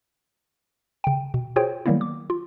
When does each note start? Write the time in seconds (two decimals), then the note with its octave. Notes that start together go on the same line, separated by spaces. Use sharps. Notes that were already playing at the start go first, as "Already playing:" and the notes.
1.04 C#3 G5
1.34 B2
1.56 F4 F#4 G#4 C5 C#5 G5
1.86 D#3 F#3 G3 A#3 B3 E4
2.01 D6
2.30 F4